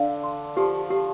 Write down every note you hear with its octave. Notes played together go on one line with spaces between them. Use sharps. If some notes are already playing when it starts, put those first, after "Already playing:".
Already playing: D3 F5
C6
F3 G4
G4